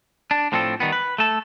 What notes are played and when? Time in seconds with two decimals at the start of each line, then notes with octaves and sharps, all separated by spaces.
0.31 D4
0.52 A2 F3 C4 D4 A4
0.80 D#3 G3 B3
0.92 B4
1.18 A3 A4